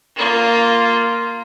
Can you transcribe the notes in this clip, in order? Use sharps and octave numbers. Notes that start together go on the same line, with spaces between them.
A#3 F4